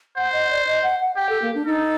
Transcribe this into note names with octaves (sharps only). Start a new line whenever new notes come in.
C5 F#5
D#5
D5
D#5
F#5
F#5
G4 G5
A4
A#3
D4
D#4 A4